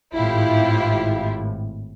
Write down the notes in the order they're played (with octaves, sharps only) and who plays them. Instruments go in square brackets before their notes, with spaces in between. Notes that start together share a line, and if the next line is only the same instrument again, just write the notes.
[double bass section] G#1 A2 [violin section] E4 F4 G4